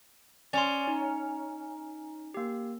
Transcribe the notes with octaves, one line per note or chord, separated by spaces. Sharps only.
C#4 D5 G#5 C6
D#4
A#3 G4